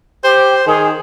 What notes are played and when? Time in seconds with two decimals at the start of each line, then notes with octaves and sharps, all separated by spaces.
0.24 G4 C5
0.67 D#3 G#4